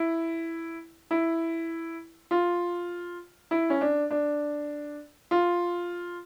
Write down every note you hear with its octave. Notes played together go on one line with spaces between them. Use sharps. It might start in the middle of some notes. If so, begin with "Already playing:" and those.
Already playing: E4
E4
F4
E4
C#4
D4
D4
F4